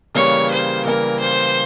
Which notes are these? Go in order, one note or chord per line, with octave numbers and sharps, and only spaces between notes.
C#3 E3 G3 A#3 C#5
C5
C#3 E3 G3 A#3 A#4
C5